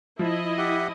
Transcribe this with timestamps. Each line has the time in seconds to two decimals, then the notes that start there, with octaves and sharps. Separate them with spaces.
0.19 F3 E4 D#5
0.58 G4 E5 F#5